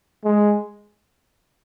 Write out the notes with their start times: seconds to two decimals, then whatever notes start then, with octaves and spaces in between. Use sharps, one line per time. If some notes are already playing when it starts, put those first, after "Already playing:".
0.25 G#3